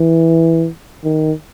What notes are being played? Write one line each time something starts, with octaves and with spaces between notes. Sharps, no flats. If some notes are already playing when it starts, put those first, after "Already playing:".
Already playing: E3
D#3